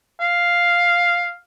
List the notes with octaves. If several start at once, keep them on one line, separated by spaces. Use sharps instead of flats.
F5